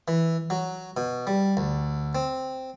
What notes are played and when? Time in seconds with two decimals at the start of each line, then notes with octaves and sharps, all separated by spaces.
0.08 E3
0.50 F#3
0.97 B2
1.27 G3
1.57 D2
2.15 C4